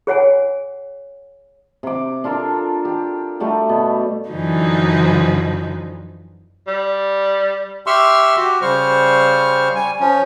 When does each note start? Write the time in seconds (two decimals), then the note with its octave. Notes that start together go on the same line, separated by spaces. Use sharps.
0.07 G#4 C#5 F#5 G#5
1.83 C3 D6
2.24 D4 F4 A4 A#4
2.85 G4
3.40 G3 A3 F#4 G4
3.69 B2 B3
4.30 F#2 D3 E3 F3 D#4 F#4
6.67 G3
7.87 G4 E5 C6 C#6 E6 F6
8.36 F#4 G4
8.62 C#3 G3 C5 C#6 F6
9.75 G3 G#5
10.00 F3 C#4